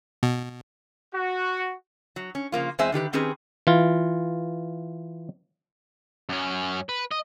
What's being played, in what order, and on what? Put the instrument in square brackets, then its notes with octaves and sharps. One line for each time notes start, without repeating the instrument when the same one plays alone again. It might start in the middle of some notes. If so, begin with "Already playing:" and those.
[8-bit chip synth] B2
[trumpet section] F#4
[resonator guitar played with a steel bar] F#3
C#4
C#3 F3 A#3 F4
E2 G#3 C4 C5 E5 G#5
D3 D#3 G4 B4
D#3 C4 C#4 G4 G#4 B4
[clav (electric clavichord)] E3 F4
[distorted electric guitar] F#2 C#4
B4
D#5